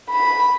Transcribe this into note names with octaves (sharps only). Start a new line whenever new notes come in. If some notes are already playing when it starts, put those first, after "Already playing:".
B5